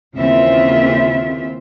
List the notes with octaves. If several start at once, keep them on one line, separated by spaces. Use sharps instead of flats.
D#2 C#3 E3 C4 F4 E5